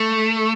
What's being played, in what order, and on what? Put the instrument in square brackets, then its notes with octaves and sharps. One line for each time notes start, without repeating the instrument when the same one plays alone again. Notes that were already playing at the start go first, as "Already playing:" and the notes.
Already playing: [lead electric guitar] A3